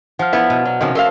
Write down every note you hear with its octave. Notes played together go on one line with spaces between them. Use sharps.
F3 F#5 F6
B3 E4
B2
F#3
C3 D#3 F3 C#4 F#4
A3 A#4 E5 F5 A5 C6